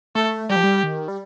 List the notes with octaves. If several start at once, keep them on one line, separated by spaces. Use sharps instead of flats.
A3 A4
G3 G4
F3
G3
D#3
G3